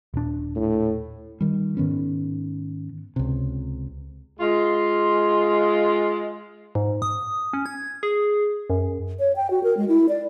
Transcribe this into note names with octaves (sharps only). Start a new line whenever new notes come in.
D#1 D4
A2
D#3 G3
G#2 D#3 B3 C#4
C#2 C3
G#3 F4 C6
G#2
D#6
C#4
G#6
G#4
F#2
C#5
G5
F#4
A#4
G#3
E4
D5